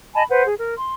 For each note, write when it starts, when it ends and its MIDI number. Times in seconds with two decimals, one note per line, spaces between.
0.14 0.23 75
0.14 0.23 80
0.14 0.23 81
0.14 0.23 83
0.29 0.43 71
0.29 0.43 72
0.29 0.43 78
0.46 0.55 68
0.58 0.74 70
0.76 0.92 84